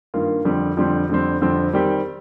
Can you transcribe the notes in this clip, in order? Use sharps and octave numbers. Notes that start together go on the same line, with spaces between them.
G2 D#3 A#3 F4
F2 D3 G3 C4
F2 D3 G3 C4
F2 D3 G3 C4
F2 D3 G3 C4
D#3 G3 C4 G4